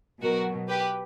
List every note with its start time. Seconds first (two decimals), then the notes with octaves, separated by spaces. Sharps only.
0.21 B2 F#3 F#4 A#4
0.68 G4 B4